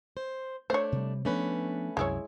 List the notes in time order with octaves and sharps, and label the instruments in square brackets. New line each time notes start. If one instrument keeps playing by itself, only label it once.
[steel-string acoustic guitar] C5
[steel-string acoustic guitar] A3 D4 [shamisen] C5 C#5
[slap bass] C3 G3
[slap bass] F3 B3 D4 [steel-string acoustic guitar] A3 C#4 B4
[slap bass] C2 F#2 [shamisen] G#3 E4 C#5